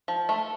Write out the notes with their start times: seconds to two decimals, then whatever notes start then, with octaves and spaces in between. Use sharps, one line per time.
0.08 F3
0.29 A3